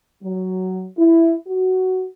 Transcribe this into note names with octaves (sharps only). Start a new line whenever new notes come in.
F#3
E4
F#4